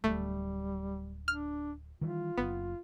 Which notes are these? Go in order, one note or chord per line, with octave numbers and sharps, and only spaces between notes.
D1 G3 A3
D4 F6
D#3 E3 G3 F4
F#1 B3